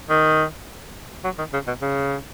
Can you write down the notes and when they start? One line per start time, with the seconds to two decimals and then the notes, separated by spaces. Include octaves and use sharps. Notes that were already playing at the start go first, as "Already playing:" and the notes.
0.10 D#3
1.24 F#3
1.38 D#3
1.53 C#3
1.67 B2
1.82 C#3